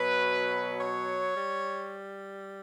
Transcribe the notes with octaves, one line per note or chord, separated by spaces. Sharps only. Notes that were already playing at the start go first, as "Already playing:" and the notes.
Already playing: B2 F#3 B4
C#5
G3